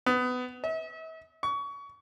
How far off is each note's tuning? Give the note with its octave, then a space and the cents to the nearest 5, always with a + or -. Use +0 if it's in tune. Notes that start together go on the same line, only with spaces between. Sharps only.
B3 +20
E5 -40
C#6 +25